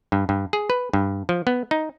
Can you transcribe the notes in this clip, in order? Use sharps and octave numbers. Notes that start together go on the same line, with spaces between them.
G2
G2
G#4
B4
G2
F3
B3
D#4